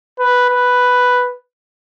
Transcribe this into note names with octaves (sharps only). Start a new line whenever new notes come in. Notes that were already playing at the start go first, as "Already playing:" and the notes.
B4
B4